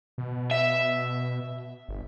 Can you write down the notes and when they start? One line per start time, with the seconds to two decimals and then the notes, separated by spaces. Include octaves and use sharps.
0.18 B2
0.51 E5
1.88 G1